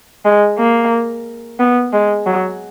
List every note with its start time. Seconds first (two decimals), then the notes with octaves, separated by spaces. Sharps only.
0.25 G#3
0.59 A#3
1.60 B3
1.93 G#3
2.27 F#3